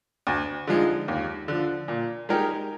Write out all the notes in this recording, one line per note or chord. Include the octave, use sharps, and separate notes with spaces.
D2
D3 F3 G#3 D#4
D#2
D3 F3
A#2
G#3 D#4 G4 A#4